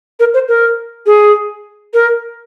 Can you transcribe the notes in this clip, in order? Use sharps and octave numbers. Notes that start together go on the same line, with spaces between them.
A#4
C5
A#4
G#4
A#4